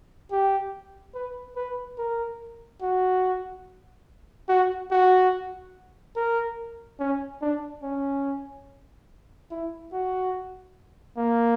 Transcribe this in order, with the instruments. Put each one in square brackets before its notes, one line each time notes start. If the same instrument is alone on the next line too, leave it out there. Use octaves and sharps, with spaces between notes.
[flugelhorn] G4
B4
B4
A#4
F#4
F#4
F#4
A#4
C#4
D4
C#4
E4
F#4
A#3